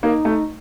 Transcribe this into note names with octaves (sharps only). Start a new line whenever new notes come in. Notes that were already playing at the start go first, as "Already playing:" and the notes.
A#3 D#4
A3